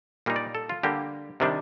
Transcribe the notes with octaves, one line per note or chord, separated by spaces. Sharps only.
A#2 G3 A#3 D#4
D5
A4
F4
D3 G3 A#3 G4
C3 D#3 G3 D4